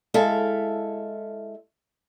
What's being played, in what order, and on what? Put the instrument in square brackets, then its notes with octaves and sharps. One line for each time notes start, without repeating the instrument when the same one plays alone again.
[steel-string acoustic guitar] G#3 E4 A4 E5 F5